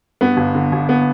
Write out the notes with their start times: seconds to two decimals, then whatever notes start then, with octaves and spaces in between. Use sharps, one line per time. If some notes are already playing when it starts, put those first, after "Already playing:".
0.21 G2 B3
0.37 G1
0.55 D3
0.72 G1
0.89 B3